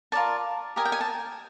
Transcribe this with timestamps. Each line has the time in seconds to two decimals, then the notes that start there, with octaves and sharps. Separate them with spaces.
0.12 F4 A#4 D5 A5
0.76 G4 A#4 D#5 G#5
0.85 G5
0.92 G#5
1.01 A5